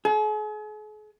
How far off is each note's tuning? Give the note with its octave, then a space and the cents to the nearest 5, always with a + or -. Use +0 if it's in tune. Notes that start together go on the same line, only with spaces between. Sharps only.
G#4 +45